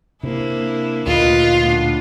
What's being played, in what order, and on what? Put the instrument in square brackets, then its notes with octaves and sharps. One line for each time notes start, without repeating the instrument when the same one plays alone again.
[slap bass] C3 [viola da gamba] A#3 D4 E4
[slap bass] D2 A#2 [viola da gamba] D#4 A#4 B4 [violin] F4
[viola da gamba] A2 B3 D4